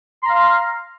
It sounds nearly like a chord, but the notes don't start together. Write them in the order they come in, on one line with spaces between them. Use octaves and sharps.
C6 A#5 F5